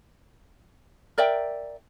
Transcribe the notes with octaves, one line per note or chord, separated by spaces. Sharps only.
A#4 D5 E5 G5